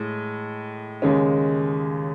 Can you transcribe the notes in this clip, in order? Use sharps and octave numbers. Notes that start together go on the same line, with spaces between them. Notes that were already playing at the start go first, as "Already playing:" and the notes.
Already playing: A2 G#3
D#2 C#3 G#3 C#4